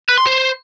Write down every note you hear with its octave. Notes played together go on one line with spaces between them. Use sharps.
B4
C6
C5